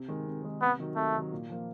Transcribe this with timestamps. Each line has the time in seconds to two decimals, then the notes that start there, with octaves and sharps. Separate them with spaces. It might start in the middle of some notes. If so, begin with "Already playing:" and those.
Already playing: C3
0.08 D#3 G#3
0.26 C3
0.43 D#3 G#3
0.61 C3 B3
0.79 D#3 F#3
0.96 C3 A3
1.15 D#3 F#3
1.32 A#2
1.50 F3 A#3